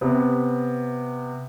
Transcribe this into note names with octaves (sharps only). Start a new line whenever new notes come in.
C3 B3